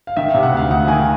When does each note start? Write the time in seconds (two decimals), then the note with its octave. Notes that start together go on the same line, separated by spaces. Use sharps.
0.07 F5
0.17 D#3 E5
0.29 F5
0.34 C3
0.43 F#5
0.52 D2
0.57 F5
0.71 D2 F#5
0.88 D#3 G#5